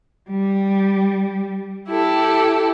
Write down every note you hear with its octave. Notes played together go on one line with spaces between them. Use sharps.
G3
E4 G4 A4